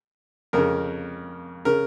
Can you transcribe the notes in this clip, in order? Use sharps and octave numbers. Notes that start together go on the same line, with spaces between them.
F2 C#3 A#4
C#3 A#4